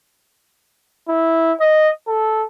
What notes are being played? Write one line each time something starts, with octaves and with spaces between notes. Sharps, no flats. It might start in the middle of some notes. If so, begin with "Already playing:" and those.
E4
D#5
A4